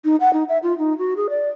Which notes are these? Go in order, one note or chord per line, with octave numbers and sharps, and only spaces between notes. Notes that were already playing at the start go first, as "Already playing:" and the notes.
D#4
F#5
D#4
E5
F4
D#4
F#4
G#4
D5